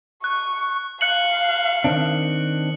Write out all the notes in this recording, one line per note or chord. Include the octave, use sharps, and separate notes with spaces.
C#6 F#6
F5 F#6 C#7 F#7
D#3 C4 D4